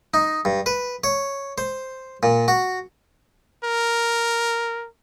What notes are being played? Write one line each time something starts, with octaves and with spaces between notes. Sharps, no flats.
D#4
G2
B4
C#5
C5
A#2
F#4
A#4